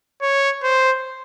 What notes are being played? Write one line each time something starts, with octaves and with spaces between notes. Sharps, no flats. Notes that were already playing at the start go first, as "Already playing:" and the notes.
C#5
C5